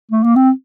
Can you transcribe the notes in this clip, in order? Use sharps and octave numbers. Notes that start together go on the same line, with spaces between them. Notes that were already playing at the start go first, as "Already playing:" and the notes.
A3
A#3
C4